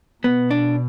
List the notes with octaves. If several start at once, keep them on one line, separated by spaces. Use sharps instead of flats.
B2 B3
D4